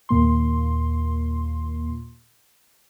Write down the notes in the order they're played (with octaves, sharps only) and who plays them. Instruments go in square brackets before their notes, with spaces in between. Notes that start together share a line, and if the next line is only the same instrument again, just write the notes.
[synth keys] D#2 A#2 A#3 C6